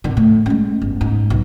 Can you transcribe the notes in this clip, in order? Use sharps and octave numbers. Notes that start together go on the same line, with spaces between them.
G#1 D3
A2
G#3 C#4
G1
G#2
B1